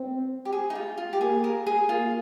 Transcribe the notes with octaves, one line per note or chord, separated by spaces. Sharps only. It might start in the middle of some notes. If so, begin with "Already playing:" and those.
Already playing: C4
G4
G#4
D#4
F4
F4
G4
A#3 G#4
A#4
G#4
A#3 F4